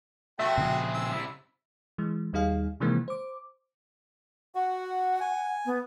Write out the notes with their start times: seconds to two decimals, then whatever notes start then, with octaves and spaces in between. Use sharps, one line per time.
0.39 A3 C4 F#4 E5 G5
0.58 A#2 C#3 F3 C4 G#4
0.94 E6
1.11 C3 E4
1.98 E3 G#3
2.33 D#2 G3 D#4 G#4 F5
2.80 C3 D#3 E3 G#3 A#3 C4
3.08 C5 D6
4.55 F#4 F#5
5.20 G#5
5.66 B3